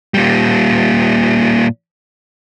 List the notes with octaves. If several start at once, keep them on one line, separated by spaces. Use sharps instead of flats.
A#2 G3